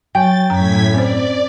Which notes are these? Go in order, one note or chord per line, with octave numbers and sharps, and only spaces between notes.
F#3 G5 G#5 A6
F#2 A2 A#5 G#6 B6
C4 C#4 C5 D5